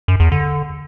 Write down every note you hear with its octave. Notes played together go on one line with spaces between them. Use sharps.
F#2
E2
D3